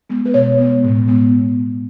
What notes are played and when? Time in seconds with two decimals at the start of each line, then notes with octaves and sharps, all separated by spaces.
0.10 G#3 B3
0.26 B4
0.34 B2 C#5
0.58 G#3 B3
0.84 A2
1.08 G#3 B3